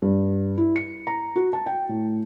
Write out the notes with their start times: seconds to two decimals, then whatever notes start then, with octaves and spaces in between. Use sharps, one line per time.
0.02 G2
0.57 E4
0.76 C#7
1.07 A#5
1.36 F#4
1.53 A5
1.66 G5
1.89 A2